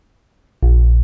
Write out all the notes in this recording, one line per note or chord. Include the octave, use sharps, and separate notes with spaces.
A#1